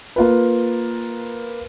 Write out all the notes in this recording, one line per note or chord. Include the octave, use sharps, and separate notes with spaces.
A#3 F4 B4